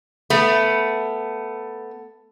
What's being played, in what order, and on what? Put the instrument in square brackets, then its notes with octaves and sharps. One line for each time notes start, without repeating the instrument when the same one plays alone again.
[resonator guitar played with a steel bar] A3 B3